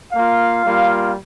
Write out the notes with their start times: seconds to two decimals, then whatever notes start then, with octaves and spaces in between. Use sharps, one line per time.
0.13 A#3 F4 F5
0.65 G3 A#3 F4